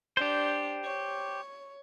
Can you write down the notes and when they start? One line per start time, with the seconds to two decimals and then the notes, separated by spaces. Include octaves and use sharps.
0.17 D4 G4 C5
0.84 C#5